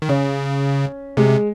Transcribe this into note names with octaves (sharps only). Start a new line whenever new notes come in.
D#3
C#3 C#4
C3 G#3